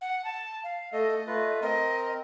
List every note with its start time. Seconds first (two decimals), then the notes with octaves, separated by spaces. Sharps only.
0.01 F#5
0.24 A5
0.64 F5
0.93 A3 A4 D#5
1.27 A3 F4 B4
1.62 C4 A#4 D#5